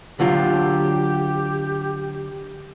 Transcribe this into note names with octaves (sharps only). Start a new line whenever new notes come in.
D3 F#3 F4 G4